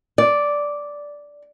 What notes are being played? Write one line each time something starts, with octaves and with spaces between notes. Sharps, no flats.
D5